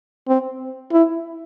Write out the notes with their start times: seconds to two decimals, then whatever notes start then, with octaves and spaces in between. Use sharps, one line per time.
0.28 C4
0.92 E4